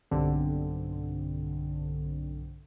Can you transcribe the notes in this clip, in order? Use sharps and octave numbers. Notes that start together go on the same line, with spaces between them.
B1 G2 D3 C4